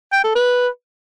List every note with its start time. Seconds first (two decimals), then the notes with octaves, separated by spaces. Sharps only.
0.13 G5
0.24 A4
0.35 B4